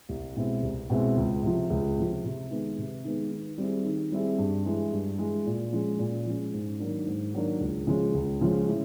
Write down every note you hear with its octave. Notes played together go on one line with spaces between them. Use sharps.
C2
B2 G#3 C4 E4
C2
B2 G#3 C4 E4
C#2
C3 F3
C#2
C3 F3
C3
D#3 G#3 B3
C3
D#3 G#3 B3
D#3
G3 C4 E4 G#4
D#3
G3 C4 E4 G#4
G2
E3 G#3
G2
E3 G#3
A#2
F3 G#3 C#4
A#2
F3 G#3 C#4
G#2
D#3 F#3 A#3 D4
G#2
D#3 F#3 A#3 D4
C#2
C#3 F3 G#3
C#2
C#3 F3 G#3
A2